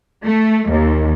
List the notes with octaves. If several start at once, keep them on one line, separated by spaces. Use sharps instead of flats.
A3
D#2